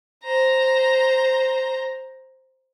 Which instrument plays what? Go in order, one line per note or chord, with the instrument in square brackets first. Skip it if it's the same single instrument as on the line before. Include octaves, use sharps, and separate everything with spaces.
[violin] C5 A#5